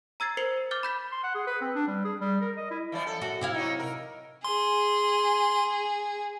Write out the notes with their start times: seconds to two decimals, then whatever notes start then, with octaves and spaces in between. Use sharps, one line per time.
0.20 A#5 E6 G#6 A6 C7
0.37 A#4 C5 C7 C#7 F#7
0.71 D6 F6 G6 A6
0.83 B5 G6 B6
1.12 C6
1.23 F#5
1.35 G#4
1.47 B4
1.61 C4
1.75 D4
1.88 G3
2.05 G#4
2.20 G3
2.41 A#4
2.57 D#5
2.71 E4
2.92 E3 F3 D5
3.06 F#2 A4
3.22 F#4
3.41 C3 E4 F5
3.54 F#3 D#4
3.79 A#4
4.45 G#4 C6